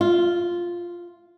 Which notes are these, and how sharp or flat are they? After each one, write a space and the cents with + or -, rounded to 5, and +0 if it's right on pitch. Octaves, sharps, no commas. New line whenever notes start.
F4 +0 E5 +40